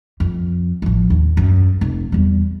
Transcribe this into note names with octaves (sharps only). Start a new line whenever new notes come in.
F2
A1 F3
D#2
F#2
F1
E2 G3